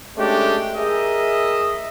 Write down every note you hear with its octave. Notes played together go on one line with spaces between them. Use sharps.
G#3 A3 C#4 D4 G4
G#4 A#4 D#5 E5